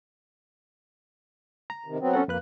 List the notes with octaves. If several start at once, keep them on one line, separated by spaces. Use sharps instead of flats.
A#5
C3 D#3
F#3 B3 C4
C#4 A4 F#5
F2 A#3 B4 F#6